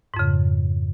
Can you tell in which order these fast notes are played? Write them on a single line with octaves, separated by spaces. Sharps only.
G#2 F2 C#3